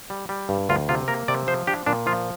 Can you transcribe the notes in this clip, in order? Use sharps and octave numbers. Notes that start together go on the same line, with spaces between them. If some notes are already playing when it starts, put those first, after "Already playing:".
G3
G3
G2
D2 F4
C3 F4
A#3 A#4
C3 D5
F3 C5
D4 G4
A#2 D4
F3 F4